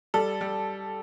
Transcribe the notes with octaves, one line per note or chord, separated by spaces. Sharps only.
G3 A4
G3